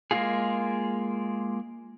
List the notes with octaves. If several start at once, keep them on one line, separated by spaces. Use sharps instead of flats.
G#3 A#3 C4 E4 F4 G#4